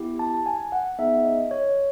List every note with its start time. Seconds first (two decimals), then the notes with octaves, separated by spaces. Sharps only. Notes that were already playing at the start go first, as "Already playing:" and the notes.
Already playing: B3 E4 G4
0.19 A5
0.46 G#5
0.72 F#5
0.99 B3 D#4 G#4 E5
1.24 D#5
1.51 C#5